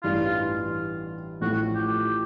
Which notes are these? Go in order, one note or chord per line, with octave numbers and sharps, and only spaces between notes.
A1 G2 E3 F4
A1 A2 F3 F#4
G4